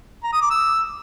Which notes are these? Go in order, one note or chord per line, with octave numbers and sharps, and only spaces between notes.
A#5
D#6
D6
E6